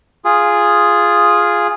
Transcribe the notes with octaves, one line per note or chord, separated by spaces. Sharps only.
F4 G#4